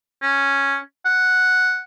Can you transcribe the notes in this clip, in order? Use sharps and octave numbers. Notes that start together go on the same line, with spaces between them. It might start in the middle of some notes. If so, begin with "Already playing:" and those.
C#4
F#5